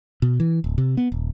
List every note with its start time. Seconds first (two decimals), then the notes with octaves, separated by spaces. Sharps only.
0.22 B2
0.40 E3
0.64 D1
0.78 C3
0.97 B3
1.12 D#1